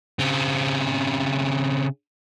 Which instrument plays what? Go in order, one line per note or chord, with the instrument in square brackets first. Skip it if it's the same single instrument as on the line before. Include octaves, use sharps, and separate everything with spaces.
[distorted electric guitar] C#3 C4